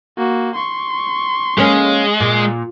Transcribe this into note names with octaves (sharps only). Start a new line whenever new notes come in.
A#3 F#4
C6 C#6
G#3 A#3 C#4
A#2